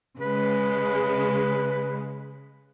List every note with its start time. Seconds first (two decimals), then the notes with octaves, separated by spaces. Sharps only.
0.19 C#3 G#3 B4